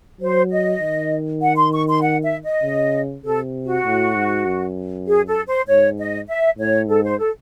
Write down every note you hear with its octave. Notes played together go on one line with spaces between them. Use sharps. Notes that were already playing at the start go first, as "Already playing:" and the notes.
F#3 C5
D#5
D#3
F#5
C6
C#6
C6
F#5
E5
D#5
C#3
C3 A4
F#4
A2
G#2
F#2
G#4
A4
C5
G#2 C#5
D#5
E5
A2 C#5
G#2 A4
C5
A4